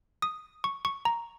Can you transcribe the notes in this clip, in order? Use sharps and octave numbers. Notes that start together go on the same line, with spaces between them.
D#6
C#6
C#6
A#5